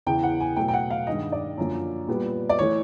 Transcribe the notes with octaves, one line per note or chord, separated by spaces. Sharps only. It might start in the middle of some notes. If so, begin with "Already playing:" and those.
E2 C#3 E3 G5
F#5
G#5
B2 F#3 A3 G5
G5
F#5
F5
G2 D#3 G#3 D#5
D5
F#2 D3 F3 A#3
A#2 G3 B3
D5
E3 A3 C#5